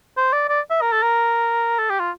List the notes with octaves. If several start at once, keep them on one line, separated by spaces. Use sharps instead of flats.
C5
D5
D5
E5
A#4
A4
A#4
A4
G4
F4